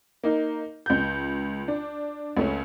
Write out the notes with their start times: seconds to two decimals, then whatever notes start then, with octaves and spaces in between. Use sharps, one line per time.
0.23 A#3 D#4
0.86 C#2 G6
1.68 D4
2.37 C#2 A3 C#4